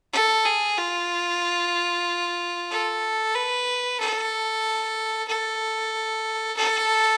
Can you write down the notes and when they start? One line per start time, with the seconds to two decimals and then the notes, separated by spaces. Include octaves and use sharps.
0.13 A4
0.46 G#4
0.78 F4
2.71 A4
3.35 B4
4.00 A4
5.28 A4
6.57 A4